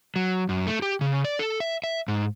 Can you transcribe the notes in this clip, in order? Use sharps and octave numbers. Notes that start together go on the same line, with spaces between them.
F#3
F#2
A3
G4
C#3
D5
A4
E5
E5
G#2